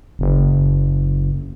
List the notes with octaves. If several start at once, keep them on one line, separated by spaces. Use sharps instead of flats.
F#1